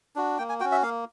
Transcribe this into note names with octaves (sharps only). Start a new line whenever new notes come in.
D4 F#4
A#3 G5
G#5
C#4 F#4 G5
E5
A#3 F5